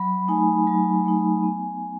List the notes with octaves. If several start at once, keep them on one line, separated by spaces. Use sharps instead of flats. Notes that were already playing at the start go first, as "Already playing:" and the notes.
Already playing: F#3 B5
A3 D#4 G#5
F#3
A3 D#4
B3